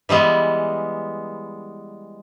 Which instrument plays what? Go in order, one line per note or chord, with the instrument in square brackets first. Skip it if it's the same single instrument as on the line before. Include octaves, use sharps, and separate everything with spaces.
[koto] E3 G3 G#3 B3